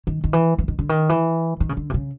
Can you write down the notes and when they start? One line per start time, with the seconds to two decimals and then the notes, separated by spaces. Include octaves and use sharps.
0.07 D#3
0.24 D#3
0.33 E3
0.58 E3
0.68 D#3
0.79 D3
0.89 D#3
1.09 E3
1.60 D#3
1.69 C#3
1.77 D3
1.90 C3
1.94 C#3